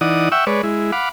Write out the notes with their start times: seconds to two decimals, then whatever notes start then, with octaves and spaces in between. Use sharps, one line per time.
0.01 E3 D#4 D5 F#5 D#6
0.32 E5 F#5 G5 C#6 E6
0.47 G#3 B4 C#5 D5
0.63 G#3 E4
0.92 F5 F#5 B5 D6